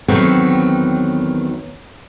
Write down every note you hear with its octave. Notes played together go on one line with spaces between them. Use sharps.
E2 D#3 F#3 A3 B3 C4